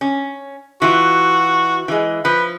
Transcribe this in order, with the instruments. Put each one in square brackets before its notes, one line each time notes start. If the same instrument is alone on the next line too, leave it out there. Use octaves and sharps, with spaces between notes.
[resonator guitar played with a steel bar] C#4
[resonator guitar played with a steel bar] E3 F4 [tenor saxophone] F#4
[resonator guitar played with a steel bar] E3 G#3
[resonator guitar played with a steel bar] F3 [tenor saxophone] B4